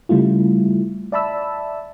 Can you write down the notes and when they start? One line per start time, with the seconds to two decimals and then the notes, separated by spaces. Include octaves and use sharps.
0.09 C#3 G3 A3 E4 F4
1.12 D5 E5 A5 B5 E6